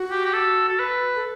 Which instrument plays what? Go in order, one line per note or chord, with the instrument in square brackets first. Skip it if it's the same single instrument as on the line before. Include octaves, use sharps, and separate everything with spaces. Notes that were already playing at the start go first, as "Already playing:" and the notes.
Already playing: [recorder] F#4
[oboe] G4
G4
A4
A4
B4
[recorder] A4